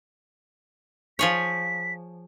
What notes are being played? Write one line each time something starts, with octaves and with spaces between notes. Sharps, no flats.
F3 G#4 C#5 B6